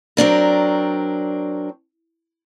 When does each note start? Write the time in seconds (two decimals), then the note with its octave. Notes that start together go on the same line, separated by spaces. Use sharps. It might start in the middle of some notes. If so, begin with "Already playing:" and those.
0.17 F#3 C4 D4 A#4